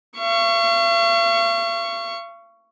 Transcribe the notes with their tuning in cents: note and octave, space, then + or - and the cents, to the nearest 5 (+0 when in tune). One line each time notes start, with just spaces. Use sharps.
F5 -45 C#6 +0